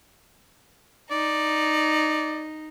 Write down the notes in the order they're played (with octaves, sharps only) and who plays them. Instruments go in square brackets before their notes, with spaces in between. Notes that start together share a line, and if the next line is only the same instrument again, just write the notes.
[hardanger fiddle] D#4 [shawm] D5